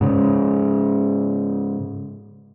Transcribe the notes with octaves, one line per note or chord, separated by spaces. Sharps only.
G#2 C#3